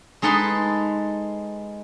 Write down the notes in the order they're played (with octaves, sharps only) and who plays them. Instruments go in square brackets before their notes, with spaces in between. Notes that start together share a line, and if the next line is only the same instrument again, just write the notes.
[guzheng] G#3 D#4 A4 B4 C6